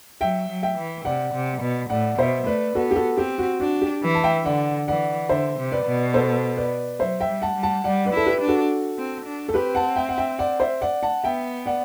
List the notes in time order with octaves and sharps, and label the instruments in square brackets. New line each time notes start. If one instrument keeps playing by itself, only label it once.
[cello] F#3 [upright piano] E5 G5
[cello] F#3
[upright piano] E5 G5
[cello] E3
[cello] C3 [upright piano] D5 F#5
[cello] C3
B2
[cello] A2 [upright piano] D5 F#5
[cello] B2 [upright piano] C5 E5
[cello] A3 [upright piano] B4 D5
[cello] B3 [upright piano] F#4 A4
[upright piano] G4
F#4 A4
[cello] C4 [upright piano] G4
[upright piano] F#4
[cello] D4 [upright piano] F#4
[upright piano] G4
[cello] E3
[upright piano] A5
E5 G5
[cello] D3 [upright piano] D5 F#5
[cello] E3 [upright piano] D5 F#5
[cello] D3 [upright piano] C5 E5
[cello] C3
[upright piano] B4 D5
[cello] B2
[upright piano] A4 C5
B4 D5
[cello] F#3 [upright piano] C5 E5
[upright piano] E5 G5
[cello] G3
[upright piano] F#5 A5
[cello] G3
[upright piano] F#5 A5
[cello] G3 [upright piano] D5 F#5
[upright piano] B4 D5
[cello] E4 [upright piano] A4
[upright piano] G4 B4
[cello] D4
[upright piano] F#4 A4
[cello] C4
D4
[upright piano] A4
[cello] C4 [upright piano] G4 B4
[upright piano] F#5 A5
E5 G5
F#5
E5 G5
D5 F#5
C5 E5
D5 F#5
F#5 A5
[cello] B3 [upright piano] E5 G5
[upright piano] D5 F#5